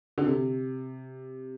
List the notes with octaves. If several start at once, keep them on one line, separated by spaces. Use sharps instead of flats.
D3
C3